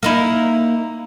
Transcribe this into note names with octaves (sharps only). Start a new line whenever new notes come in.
A#3 D#4 E4